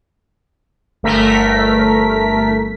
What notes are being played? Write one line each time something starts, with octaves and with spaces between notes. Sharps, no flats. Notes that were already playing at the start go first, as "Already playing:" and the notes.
G1 A3 A#4 B6